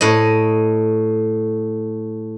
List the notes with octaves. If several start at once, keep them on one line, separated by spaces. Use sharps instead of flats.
A2 D#5